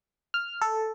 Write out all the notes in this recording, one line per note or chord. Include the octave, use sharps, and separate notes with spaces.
F6
A4